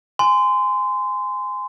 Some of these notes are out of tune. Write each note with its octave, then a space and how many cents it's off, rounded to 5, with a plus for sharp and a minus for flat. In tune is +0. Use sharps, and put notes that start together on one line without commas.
G#5 +0 C6 -25